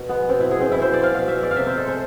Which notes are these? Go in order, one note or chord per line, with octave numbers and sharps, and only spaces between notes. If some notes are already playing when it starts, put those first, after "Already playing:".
Already playing: B2
G#3 B3
B2 C4
E4
G#3 G#4
C4
B2 E4
C5
G#3 D5
F5
B2 F5
E5
G#3
D5
F5
C3 E5
C5
G#3 A4
C5